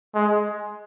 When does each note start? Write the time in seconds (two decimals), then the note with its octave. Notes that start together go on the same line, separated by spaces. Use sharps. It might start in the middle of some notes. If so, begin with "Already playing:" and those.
0.15 G#3